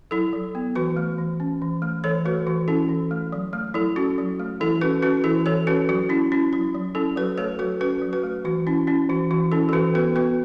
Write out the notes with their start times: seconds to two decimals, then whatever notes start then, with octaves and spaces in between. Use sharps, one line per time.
0.11 F#3 E4 A4
0.33 F#3
0.55 B3
0.75 E3 F#4 B4
0.97 A3
1.18 E3
1.40 C#4
1.62 E3
1.82 A3
2.04 E3 A4 C#5
2.25 A3 F#4 B4
2.47 E3 F#4
2.68 C#4 E4 A4
2.89 E3
3.11 A3
3.32 F#3
3.53 A3
3.74 F#3 E4 A4
3.96 C#4 F#4
4.18 F#3
4.40 A3
4.60 E3 E4 A4
4.81 C#4 F#4 B4
5.02 C#4 F#4 B4
5.24 E3 E4 A4
5.46 E3 A4 C#5
5.67 C#4 F#4 B4
5.89 F#3 F#4
6.09 C#4 E4
6.32 C#4 E4
6.53 F#3 E4
6.75 F#3
6.95 C#4 E4 A4
7.16 F#3 F#4 B4
7.38 A3 A4 C#5
7.59 F#3 F#4 B4
7.80 C#4 F#4 B4
8.02 F#3
8.13 F#4 B4
8.23 A3
8.45 E3 F#4
8.67 C#4 E4
8.87 C#4 E4
9.10 E3 F#4
9.31 E3 F#4
9.52 C#4 E4 A4
9.69 A4
9.73 E3 F#4 B4
9.94 B3 F#4 B4
10.15 B3 F#4 B4